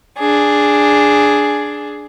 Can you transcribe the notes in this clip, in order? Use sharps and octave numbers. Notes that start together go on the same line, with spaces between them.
D4 G#4